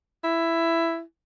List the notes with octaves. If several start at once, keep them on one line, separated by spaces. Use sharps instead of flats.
E4